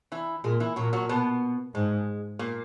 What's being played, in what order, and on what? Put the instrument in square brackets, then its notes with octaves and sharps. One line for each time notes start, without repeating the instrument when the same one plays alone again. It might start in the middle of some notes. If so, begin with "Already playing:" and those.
[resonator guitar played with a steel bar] E3 E4
[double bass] A#2 [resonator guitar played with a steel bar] G#3 G#4
[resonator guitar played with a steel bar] E3 E4
[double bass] A#2 [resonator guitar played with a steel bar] F#3 F#4
[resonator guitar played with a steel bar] F#3 F#4
B2 B3
[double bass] G#2 [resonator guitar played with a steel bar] G#3
[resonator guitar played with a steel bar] A#2 A#3